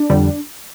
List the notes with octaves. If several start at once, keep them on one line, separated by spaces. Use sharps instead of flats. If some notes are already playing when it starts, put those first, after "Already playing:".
Already playing: D4
F2 D3 G3